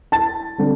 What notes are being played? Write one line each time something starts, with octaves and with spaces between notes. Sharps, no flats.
A5 A6
D3 G3 C4